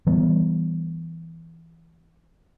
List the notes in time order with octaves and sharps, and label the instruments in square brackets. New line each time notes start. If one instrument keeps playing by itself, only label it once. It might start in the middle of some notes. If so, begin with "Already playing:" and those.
[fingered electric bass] E3 G3 B3